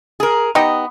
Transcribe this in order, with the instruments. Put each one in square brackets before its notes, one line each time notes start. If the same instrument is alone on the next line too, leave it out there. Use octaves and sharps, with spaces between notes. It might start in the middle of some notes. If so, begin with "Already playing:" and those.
[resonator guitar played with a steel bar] G#4 A#4
[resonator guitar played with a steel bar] B3 [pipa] D#4 G4 D#5